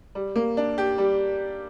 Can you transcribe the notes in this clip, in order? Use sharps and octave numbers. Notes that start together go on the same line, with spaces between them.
G3
A#3
D4
G4
G3